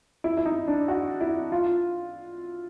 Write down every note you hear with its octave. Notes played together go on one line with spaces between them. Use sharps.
E4
E4
D#4
D4
F#4
E4
F4